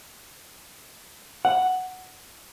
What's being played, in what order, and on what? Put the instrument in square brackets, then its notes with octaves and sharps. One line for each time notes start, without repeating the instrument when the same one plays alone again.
[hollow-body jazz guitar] F#5